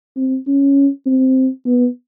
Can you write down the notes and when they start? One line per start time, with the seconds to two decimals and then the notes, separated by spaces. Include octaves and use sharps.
0.16 C4
0.47 C#4
1.06 C4
1.66 B3